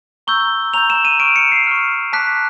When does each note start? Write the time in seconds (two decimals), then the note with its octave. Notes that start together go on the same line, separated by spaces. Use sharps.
0.27 A#5 C#6 E6 G6 G7
0.74 A#5 C#6 E6 G6 F7
0.90 E7
1.05 D#7
1.20 C#6 F6 D7
1.36 C#7
1.52 C7
1.67 C#6 F6
2.13 A5 D6 F#6 B6